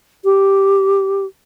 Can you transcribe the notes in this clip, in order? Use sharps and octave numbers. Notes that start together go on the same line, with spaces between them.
G4